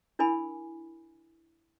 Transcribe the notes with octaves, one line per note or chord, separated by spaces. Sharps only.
D4 E4 A#4 G#5 B5